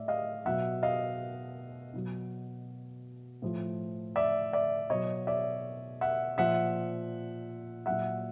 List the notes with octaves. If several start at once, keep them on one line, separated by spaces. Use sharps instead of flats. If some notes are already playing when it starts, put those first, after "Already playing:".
Already playing: A2 D5 E5
D#5 F5
B2 F#3 E5 F#5
D#5 F5
B2 F#3
A2 F3
D5 E5
D5 E5
B2 F#3 C#5 D#5
D5 E5
E5 F#5
A#2 F3 E5 F#5
A#2 F#3 E5 F#5